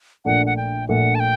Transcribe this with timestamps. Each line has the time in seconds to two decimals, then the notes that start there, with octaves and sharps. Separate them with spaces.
0.25 A#1 A#2 A3 D4 F#5
0.46 F#5
0.56 G5
0.89 A#1 A#2 A3 D4 F#5
1.15 A5
1.20 G5